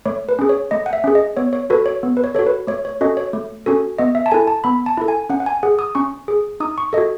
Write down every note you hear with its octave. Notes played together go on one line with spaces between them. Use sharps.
A3 C#5
B4
C#4 G#4
C#5
A3 D#5
F#5
E5
C#4 G#4
D#5
B3 C#5
C#5
F#4 A4 B4
C#5
B3
B4
C#5
F#4 A4 C#5
B4
A3 C#5
C#5
C#4 F#4 A4 D#5
C#5
A3
C#4 F#4 A4
B3 D#5
E5
A5
E4 A4 G#5
A5
B3 B5
A5
E4 A4
G#5
C#4 F#5
F#5
G#5
G#4 F#5
D#6
C#4 C#6
G#4
D#4 D#6
C#6
A4 D#5
F#4